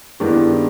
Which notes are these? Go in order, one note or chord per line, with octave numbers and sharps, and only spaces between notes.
G2 D#3 G#3 B3 D4 E4
D#4